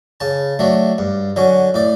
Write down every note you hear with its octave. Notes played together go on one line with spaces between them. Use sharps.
C#3 A5
F#3 A3 D4
G2
D3 F#3 C#4
A2 D5